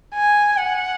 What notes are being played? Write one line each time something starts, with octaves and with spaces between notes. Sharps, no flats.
G#5
F#5